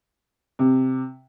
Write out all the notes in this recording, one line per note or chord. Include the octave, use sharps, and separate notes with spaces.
C3